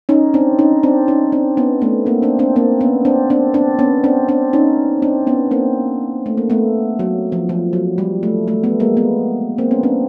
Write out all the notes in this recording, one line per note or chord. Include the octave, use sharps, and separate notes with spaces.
C#4 D#4
C4 D4
C#4 D#4
C4 D4
C#4 D#4
C4 D4
B3 C#4
A3 B3
A#3 C4
C4 D4
C4 D4
A#3 C4
B3 C#4
C4 D4
C4 D4
C4 D4
B3 C#4
C4 D4
C4 D4
C#4 D#4
C4 D4
B3 C#4
A#3 C4
A3
A#3
A3 B3
F#3
F3
F3
F#3
G3
A3
A3
A3 B3
G#3 A#3
A3 B3
A#3 C4
B3 C#4
C4 D4